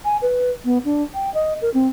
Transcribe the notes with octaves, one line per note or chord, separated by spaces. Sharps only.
G#5
B4
B3
D4
G5
D#5
A#4
C4